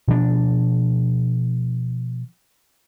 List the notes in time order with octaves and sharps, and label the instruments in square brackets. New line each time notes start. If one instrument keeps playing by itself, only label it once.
[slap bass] B2 F3 D4